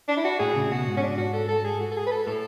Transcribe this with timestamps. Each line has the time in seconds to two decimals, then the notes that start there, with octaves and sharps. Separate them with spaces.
0.08 D4
0.17 E4
0.25 F#4
0.39 A2 G#4
0.56 C#3
0.71 B2 F#4
0.87 G#2
0.97 C#4
1.03 D4
1.17 F#4
1.33 A4
1.49 A4
1.64 G#4
1.80 F#4
1.92 A4
1.97 G#4
2.07 B4
2.11 A4
2.27 A2 A4